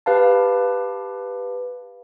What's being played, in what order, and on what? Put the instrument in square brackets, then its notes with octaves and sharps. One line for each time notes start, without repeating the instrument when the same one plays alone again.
[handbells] G4 B4 F5 A5